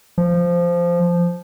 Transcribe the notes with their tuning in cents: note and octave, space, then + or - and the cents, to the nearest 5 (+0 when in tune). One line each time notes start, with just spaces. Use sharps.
F3 -10